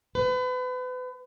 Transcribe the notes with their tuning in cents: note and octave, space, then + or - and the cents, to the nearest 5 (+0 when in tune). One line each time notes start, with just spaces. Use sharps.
B4 +35